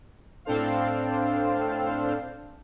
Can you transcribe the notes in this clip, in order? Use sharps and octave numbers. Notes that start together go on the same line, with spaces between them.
A2 C4 D4 A4 C5 F5